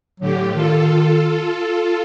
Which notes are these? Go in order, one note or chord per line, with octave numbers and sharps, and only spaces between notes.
A2 D3 F#3 G4
D#3 F4 A4